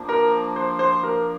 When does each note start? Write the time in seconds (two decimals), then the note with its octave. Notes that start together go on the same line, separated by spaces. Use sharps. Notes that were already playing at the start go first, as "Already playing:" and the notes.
Already playing: F3 A#3 D4
0.09 A#4
0.56 C5
0.79 C5
1.03 A#4